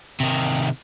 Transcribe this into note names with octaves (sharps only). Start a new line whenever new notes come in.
C3 D#3